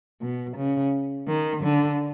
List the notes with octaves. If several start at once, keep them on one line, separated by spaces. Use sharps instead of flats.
B2
C#3
D#3
D3